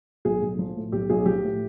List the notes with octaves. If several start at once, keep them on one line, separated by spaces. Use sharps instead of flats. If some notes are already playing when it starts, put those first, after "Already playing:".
B1 G#4
B1
F3
A2
B1 G4
B1 G#4
F3 G4
A2